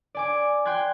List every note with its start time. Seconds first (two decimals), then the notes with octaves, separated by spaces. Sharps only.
0.15 D5 G#5 D6
0.65 G5 C6 F#6 G#6